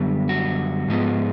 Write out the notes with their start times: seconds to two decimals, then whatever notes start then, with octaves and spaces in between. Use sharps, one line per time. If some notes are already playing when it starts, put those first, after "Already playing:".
Already playing: F#2 D3 G3 B3
0.29 F#4
0.88 G#2 F3 G#3 B3